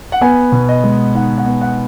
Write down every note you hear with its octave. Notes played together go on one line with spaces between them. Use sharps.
F#5
B3 G#5
B2
D#5
G#3
D#4 F#5
F#5
B3
F#5